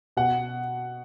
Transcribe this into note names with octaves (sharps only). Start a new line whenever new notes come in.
B2 F#5